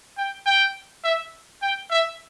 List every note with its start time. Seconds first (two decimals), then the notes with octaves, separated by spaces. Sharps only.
0.18 G5
0.46 G5
1.04 E5
1.62 G5
1.91 E5